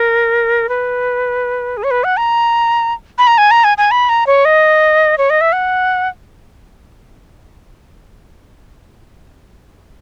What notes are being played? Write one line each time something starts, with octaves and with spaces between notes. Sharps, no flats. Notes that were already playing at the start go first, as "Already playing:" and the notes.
Already playing: A#4
B4
G#4
C#5
B4
F#5
A#5
B5
A#5
G#5
A#5
G#5
G#5
B5
A#5
C#5
D#5
C#5
D#5
E5
F#5